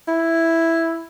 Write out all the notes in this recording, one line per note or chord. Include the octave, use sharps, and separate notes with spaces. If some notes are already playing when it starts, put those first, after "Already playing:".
E4